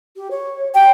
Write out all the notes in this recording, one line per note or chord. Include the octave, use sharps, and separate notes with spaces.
G4
C#5
G4 G5